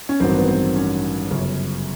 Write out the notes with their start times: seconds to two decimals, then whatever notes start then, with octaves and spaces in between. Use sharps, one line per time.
0.09 C#4
0.20 A1 G2 D#3 F#3 C4
0.38 B3
0.48 C4
0.76 C#4
1.30 G1 F#2 C#3